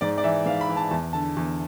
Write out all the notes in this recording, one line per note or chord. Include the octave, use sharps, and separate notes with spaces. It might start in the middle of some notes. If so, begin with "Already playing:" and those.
G#2 D5
D5
E3 E5
G#2 F5
B5
E3
A5
E2 A5
D3 A5
E2